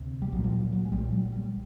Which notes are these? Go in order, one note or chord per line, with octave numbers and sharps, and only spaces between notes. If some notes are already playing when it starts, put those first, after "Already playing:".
Already playing: D2 C3
G3
B1 A#2 F#3
F3
F#3
F#3
G#3
B1 A#2 G3
F#3
G3